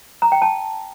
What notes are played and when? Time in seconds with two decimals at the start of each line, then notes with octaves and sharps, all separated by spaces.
0.22 A#5
0.32 G5
0.42 A5